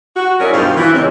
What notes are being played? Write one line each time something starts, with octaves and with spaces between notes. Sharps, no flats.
F#4
F#3 C#4 E4 G#4 A#4 D5
G2 B2 D#3 C4 F4
E3
F2 A#2 C#3 G#3 C4 C#4